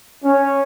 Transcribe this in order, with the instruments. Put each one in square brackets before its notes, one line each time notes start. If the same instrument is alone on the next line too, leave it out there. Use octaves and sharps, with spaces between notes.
[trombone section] C#4